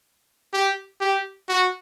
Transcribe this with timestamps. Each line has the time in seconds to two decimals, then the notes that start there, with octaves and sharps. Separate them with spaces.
0.53 G4
1.01 G4
1.49 F#4